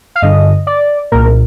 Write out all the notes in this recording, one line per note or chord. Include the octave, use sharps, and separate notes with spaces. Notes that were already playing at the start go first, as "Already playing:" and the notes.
F5
G2 D3 D#5
D5
C2 A#2 A#4